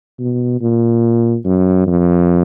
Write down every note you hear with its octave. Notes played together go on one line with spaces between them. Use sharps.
B2
A#2
F#2
F2